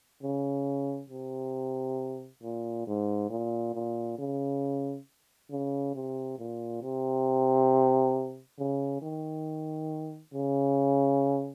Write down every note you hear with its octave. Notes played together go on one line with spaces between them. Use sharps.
C#3
C3
A#2
G#2
A#2
A#2
C#3
C#3
C3
A#2
C3
C#3
D#3
C#3